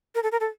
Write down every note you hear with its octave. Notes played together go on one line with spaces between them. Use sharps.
A#4
A4
A#4
A4